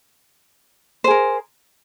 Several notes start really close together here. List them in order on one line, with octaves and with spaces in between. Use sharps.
C5 G#4 A#4